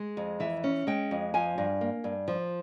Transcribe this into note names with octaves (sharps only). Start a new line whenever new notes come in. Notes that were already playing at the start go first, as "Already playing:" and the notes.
Already playing: G#3
F2
E3 E5
C#4
G#3 G5
F2
F3 G#5
G2
A#3
G2
F3